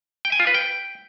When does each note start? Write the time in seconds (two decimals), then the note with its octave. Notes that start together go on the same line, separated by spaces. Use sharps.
0.25 G5
0.32 G#5
0.40 F4
0.47 B4
0.54 G5